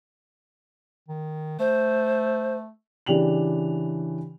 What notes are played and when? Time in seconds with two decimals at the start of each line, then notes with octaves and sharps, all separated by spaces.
1.08 D#3
1.59 A3 C5
3.06 C#3 E3 D4 G4 F7 F#7